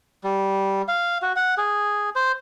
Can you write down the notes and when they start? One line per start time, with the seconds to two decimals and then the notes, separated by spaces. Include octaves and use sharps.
0.24 G3
0.88 F5
1.22 F#4
1.36 F#5
1.58 G#4
2.16 C5